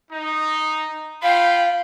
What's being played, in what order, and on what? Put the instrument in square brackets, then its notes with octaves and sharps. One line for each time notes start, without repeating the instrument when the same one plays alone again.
[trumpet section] D#4
[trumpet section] F4 G5 B5 [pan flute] F5